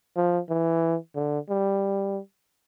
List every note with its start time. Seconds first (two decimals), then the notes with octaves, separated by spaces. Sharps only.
0.16 F3
0.50 E3
1.16 D3
1.50 G3